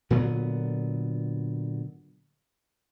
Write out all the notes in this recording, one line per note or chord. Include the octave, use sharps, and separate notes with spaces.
A#2 D3 F#3 B3